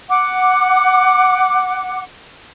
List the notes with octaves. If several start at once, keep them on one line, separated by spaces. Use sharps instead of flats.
F#5 D6